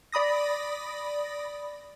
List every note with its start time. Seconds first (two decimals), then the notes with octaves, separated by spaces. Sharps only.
0.12 D5 B5 D#6 A#6